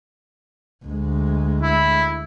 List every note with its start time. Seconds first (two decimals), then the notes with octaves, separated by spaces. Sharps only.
0.85 D2 G#3
1.62 E4